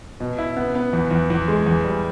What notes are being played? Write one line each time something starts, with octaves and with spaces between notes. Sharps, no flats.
B2
E4
B3
B3
E2
E2
E2
G#3
E2
G3